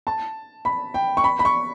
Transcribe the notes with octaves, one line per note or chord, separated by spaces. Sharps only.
A5
B5
G5
C#6
B5
B5
C#6